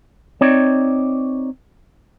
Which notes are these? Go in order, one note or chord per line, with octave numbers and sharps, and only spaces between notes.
C4 D#4 C#5 D5